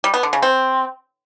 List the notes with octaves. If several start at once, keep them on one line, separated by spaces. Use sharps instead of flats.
G3
B3
D3
C#3
C4